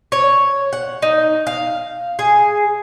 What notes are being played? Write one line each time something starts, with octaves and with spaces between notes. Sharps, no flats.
C#5
F#5
D#4
F5
G#4